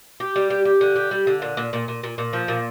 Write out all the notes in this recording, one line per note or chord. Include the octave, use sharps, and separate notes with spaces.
G4
G3
G4
G4
D3
G4
G3
D3
A#2
A#2
A#2
A#2
A#2
A#2
F3
A#2